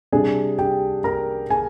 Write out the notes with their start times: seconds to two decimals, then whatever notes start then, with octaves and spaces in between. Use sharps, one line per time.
0.12 C3 G3 D4 G#4 G#5
0.58 G4 G5
1.04 A#4 A#5
1.50 G#4 G#5